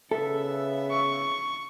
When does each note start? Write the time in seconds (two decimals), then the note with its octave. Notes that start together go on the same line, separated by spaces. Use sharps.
0.11 C#3 B3 A4 E5
0.91 C#6